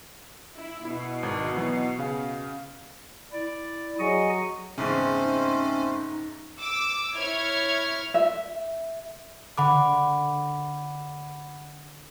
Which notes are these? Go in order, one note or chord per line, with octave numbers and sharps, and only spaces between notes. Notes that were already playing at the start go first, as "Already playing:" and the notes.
E4
B2 E4
G#1
E3 F#3 B3
C#3 F5
E4 D5
F#3 G#4 D#5 G#5 C#6
E2 G#2 C#3 A3 C4 C#4 C5
D#4
D6 E6
E4 C#5 F6 G#6
E5
D3 F#5 B5 D6